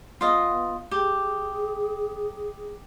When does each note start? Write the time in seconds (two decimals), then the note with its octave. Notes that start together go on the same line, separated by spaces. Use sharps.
0.21 B3 F4 D#5
0.91 G4 G#4